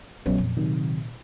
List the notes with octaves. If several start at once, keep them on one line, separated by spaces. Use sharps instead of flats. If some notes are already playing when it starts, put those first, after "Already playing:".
A#1 F#3 B3 C#4
F2 A#2
C3 D#3 F#3